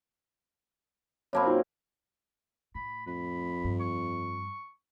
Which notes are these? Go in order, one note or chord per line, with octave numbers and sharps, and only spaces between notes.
F#2 A#3 C4 C#5 A5 B5
D#4 F4 F#4
A2 B5
F2 B5
G2
C#6